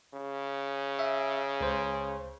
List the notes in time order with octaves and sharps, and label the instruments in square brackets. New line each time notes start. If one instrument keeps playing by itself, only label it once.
[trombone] C#3
[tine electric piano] E5
C#2 C5